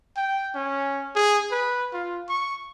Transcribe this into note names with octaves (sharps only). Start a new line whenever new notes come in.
G5
C#4
G#4
B4
F4
C#6